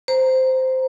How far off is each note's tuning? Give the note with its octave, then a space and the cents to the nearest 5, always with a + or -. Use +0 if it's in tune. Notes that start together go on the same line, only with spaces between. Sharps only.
C5 -10 A#5 +0